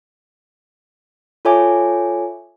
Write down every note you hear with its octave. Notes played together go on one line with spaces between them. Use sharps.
F4 A4 C#5 E5 G#5 D6